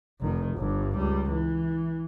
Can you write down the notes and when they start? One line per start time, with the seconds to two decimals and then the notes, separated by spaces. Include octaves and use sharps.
0.21 F1 D#3
0.56 G1 G2
0.96 C#2 G3
1.30 E3